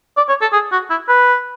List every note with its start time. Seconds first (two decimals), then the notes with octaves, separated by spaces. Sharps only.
0.17 D5
0.29 C#5
0.41 A4
0.53 G#4
0.72 F#4
0.90 E4
1.08 B4